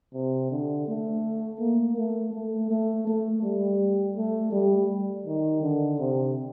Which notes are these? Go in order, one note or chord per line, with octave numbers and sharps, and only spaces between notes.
C3
D3
A3
A#3
A3
A3
A3
A3
G3
A3
G3
D#3
D3
C3